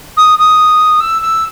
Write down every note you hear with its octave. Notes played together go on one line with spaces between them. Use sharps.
D#6
D#6
E6
E6